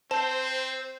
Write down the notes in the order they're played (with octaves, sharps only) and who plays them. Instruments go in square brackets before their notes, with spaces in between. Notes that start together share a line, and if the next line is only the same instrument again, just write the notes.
[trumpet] C4 [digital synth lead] C5 [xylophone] A5